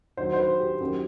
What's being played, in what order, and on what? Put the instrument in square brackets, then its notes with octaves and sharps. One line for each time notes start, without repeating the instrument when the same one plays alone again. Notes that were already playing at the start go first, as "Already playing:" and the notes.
[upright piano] G2 D#3 F#3 C5
C5
B4
G4
F#2 D#3 F#3 G4